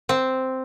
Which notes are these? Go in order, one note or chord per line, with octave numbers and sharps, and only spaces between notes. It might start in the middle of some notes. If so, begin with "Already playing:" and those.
C4